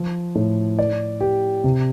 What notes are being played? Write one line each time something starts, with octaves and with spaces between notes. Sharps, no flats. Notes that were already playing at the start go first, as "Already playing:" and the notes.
Already playing: F3
A2
D5
G4
C3